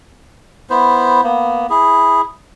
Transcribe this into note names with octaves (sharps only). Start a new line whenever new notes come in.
B3 E4 C5
A#3 B3
E4 G#4